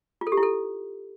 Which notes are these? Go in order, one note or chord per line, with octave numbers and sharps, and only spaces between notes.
F4
A4
G4
E4
A4